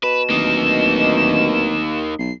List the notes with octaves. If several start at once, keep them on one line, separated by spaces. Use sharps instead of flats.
B2 B4 E7
D1 A#3 D#4
B1 C7